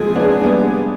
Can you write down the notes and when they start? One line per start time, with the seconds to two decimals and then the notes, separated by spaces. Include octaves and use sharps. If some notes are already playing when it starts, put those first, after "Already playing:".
Already playing: F3 G#3 C4 G#4
0.15 B3 D4
0.44 G3 B3